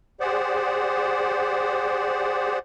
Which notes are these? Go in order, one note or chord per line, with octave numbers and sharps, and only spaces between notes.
G4 G#4 C5 D5 F#5